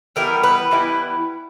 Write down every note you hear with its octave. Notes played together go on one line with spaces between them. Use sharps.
E3 G3 B3 E4 A#4
B4
E3 G3 B3 E4